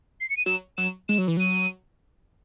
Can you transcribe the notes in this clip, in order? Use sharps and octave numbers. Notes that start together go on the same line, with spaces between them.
C7
C#7
D#7
F#3 E7
F#3 E7
G#3 E7
F#3
E3
F#3 D#7